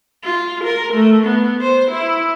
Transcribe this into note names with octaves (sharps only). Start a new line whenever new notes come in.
F4
A#4
A3
B3
C5
E4